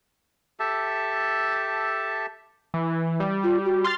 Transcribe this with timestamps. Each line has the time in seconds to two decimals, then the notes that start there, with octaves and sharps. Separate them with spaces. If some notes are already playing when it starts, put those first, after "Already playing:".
0.60 G4 A4 E5 A5
2.74 E3
3.20 G3
3.43 F4
3.65 F#4
3.84 C6 F6 A6